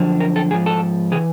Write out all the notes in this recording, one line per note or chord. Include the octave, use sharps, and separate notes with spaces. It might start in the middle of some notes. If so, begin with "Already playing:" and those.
Already playing: F#2 D3 F3
A#4
A4
G#2 F3 G#4
A4
C3 E3 G#4